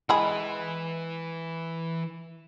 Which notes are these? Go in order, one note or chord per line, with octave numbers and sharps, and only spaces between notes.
E3 G#3 G#4 B5